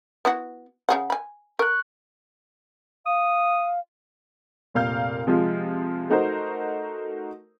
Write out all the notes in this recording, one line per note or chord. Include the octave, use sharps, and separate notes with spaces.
B3 E4 F#4
C#3 G#4 F#5
G#5 B5
A#4 C#6 F#6
F5 D#6
F1 A#2 A#4 F5 F6 G6
C3 F3 G#3 F4
A3 D#4 F#4 A#4 C5